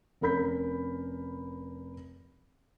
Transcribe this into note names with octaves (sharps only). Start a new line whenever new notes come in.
F1 C#4 A#4 B5 G6 B6